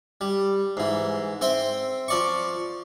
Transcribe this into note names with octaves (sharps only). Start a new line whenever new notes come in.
G3
G#2 E3
C4 C5 E5 G5
F3 D5 C#6